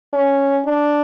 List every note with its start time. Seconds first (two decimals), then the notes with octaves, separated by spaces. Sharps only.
0.13 C#4
0.66 D4